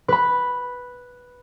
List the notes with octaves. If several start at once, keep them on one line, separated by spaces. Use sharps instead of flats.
B4 B5